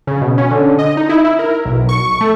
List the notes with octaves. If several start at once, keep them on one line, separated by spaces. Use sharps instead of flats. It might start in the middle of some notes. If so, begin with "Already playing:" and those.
C#3
B2
C#4
D3
D#5
D#4
E4
E4
A#4
B1
C#6
A3